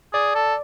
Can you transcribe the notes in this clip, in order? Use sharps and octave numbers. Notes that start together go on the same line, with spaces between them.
G#4 D5
A4